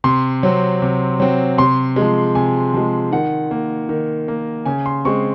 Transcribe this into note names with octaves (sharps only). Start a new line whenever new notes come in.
C3 C6
F#3 C4
C3
F#3 C4
C3 C6
F3 G#3
C3 G#5
F3 G#3
D#3 F#5
A#3
D#3
A#3
C#3 G#5
C6
G#3 C4 C#6